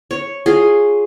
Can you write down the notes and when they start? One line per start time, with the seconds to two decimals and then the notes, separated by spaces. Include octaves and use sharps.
0.11 C#5
0.46 F4 G#4